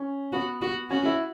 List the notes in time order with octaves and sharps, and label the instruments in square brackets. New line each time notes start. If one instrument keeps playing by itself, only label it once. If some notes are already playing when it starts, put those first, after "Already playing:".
Already playing: [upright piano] C#4
[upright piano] B3 [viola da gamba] F#4
[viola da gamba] F#4
[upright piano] C#4 [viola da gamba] F#4
[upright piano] E4